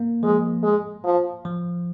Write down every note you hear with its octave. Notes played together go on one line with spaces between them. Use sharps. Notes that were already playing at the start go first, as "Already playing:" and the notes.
Already playing: A#3
F3 G#3
G#3
F3
F3